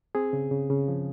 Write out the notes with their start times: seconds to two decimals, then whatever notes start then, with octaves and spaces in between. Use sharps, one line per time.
0.15 C4 G#4
0.33 C#3
0.51 C#3
0.70 C#3
0.88 F3